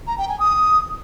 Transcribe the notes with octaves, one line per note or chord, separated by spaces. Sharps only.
A#5
G5
G#5
D#6